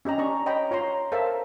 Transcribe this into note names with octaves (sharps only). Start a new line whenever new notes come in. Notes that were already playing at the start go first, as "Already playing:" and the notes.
C#4 G4 D#5 A#5
D4 D5 A#5 C#6 D#6
C#5 D#5 G5 A#5 B5
F4 C#5 A#5 C6
A4 A#4 C5 E5 F5 A5